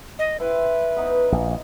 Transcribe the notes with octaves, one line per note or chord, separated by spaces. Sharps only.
D#5
E4 B4 G5 C6
B3 D#4 C#5
A#1